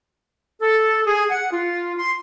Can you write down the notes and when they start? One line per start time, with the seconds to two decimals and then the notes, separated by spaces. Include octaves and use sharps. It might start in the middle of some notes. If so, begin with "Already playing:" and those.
0.62 A4
1.07 G#4
1.30 F#5
1.52 F4
1.98 C6